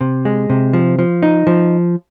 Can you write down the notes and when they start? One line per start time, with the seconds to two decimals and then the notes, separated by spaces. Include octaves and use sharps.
0.01 C3
0.25 G#3
0.50 C3
0.73 F3
0.99 F3
1.23 D#4
1.47 F3